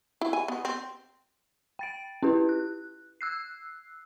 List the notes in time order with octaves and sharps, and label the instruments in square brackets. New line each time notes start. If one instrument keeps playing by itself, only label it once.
[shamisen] E4
G#5
B3
C4
[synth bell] G5 A6 D7
C#4 E4 G4 B4
F#6
E6 F#6 C7